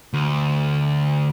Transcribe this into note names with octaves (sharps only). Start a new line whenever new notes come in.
D2